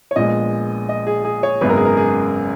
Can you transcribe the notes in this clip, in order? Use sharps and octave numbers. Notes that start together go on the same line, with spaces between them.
C#5
A#1 A#2 G#3 B3 D#5
D#5
G#4
G#4
C#5
G#1 F#2 C#3 G#3 B3 B4
A#4
G#4
A#4
G#4